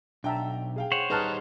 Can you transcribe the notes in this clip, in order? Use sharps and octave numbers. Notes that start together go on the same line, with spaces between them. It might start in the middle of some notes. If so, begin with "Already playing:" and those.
B1 D4 E5 G5 A5 A#5
G#4 F5 G5
C5 C#5 F#5
G3 D#4 G#4 B4 A5 A#5 F6 F#6